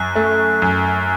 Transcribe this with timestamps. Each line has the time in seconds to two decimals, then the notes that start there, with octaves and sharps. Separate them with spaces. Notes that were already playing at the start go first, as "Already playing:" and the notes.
Already playing: F#2 F#6
0.15 A3
0.62 F#2